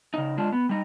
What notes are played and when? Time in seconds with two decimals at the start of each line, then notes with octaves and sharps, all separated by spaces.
0.14 C#3 D#4
0.37 G#3 D4 F4
0.52 B3
0.69 G3 D#4